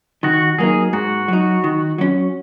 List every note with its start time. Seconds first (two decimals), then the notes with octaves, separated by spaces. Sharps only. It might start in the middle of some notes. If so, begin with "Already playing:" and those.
0.23 D#3 F#4
0.58 F#3 A#3 D#4 G#4
0.93 G#2 F#4
1.28 F#3 D#4
1.64 D#3
1.98 F#3 C#4